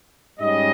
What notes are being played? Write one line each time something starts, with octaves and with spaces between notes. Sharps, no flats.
G#2 G3 C#4 D#5